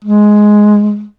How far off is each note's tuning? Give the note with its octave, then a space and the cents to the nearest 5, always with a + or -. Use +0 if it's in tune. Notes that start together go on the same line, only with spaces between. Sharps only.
G#3 +5